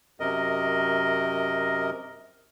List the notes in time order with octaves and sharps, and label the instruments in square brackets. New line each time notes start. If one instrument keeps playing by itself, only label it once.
[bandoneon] F#2 C3 A#4 D#5